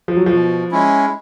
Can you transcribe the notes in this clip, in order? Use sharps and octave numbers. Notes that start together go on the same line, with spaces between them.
F3
F#3
B2 F3
G#3 C#4 E4